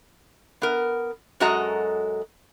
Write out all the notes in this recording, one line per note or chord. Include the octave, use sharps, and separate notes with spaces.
B3 A#4
F#2 G#3 F#4 A4 D#5 A#5